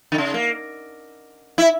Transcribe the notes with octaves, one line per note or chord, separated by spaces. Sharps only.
D3
C#3
A#3
E4